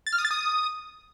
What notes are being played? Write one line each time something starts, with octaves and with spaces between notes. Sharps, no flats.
A6
F6
D#6
A6
D#6